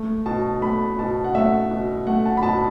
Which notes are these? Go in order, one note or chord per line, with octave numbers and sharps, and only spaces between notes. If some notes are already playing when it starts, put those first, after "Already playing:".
Already playing: A3
B2 A5
A3 B5
B2 A5
F#5
A3 E5
B2
A3 F#5
A5
B5
B2 A5